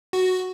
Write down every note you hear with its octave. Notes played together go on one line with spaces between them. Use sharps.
F#4